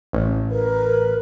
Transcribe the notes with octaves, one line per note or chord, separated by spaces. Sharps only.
A1
A#4 B4